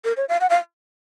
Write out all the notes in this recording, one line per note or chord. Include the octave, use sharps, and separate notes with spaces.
A#4
C#5
F5
F#5
F5